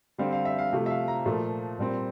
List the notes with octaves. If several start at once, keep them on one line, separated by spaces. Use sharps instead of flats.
D3 G3 C4 F5
F5
E5
F5
C3 F3 A3
E5
F5
A#5
A#2 F3 A3
A#2 G3 C4